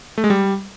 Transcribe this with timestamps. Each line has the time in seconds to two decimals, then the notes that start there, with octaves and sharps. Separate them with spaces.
0.18 A3
0.24 G#3
0.30 G3